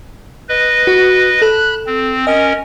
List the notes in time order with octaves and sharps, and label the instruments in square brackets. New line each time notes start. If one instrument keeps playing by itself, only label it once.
[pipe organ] B4 D#5
[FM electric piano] F#4
[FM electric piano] A4 [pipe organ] B5 F#6
[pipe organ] C4
[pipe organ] C#4 A#4 [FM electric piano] D#5